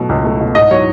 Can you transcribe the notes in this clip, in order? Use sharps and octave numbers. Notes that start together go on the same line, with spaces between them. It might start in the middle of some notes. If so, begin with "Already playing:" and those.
Already playing: B2 F#3 A3
C#2
A3
B2
G#2 D#5
F#3 C#5